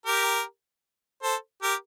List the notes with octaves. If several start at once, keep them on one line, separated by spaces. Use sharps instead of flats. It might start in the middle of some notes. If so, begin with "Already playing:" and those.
G4 A#4
A4 C5
G4 A#4